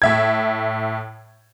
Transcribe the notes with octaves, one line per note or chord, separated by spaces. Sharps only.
A2 E5 G#6